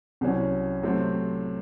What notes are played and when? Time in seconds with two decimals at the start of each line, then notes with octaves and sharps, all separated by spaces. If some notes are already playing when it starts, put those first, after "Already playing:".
0.21 C2 C3 F#3 C#4
0.83 C3 F#3 A3 C4